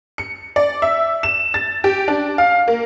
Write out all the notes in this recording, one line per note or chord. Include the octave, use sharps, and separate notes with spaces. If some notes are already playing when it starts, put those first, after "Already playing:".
C#7
D5
E5
E7
A6
G4
D4
F5
A#3